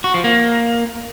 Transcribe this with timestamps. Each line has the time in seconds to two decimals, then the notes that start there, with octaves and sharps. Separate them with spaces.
0.04 F#4
0.14 F3
0.24 A#3